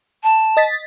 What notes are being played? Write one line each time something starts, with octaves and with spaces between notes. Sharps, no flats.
A5
D#5 A6 B6